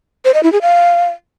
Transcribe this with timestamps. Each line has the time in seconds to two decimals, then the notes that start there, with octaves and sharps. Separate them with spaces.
0.25 C5
0.34 D#5
0.43 E4
0.52 G#4
0.62 F5